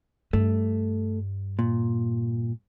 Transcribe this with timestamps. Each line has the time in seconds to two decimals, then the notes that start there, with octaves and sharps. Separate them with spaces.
0.33 G2 A3 D4
1.59 A#2